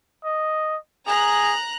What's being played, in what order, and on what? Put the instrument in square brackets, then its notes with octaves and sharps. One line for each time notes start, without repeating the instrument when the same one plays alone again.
[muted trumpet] D#5
[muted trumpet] G#4 [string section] A#5 F#6